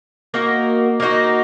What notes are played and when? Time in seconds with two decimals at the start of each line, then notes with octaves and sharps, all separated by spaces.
0.34 A#3 D#4 F#4
1.00 A#3 D#4 F#4